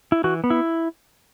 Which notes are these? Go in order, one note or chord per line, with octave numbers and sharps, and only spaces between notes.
E4
E3 F#4
B3
E4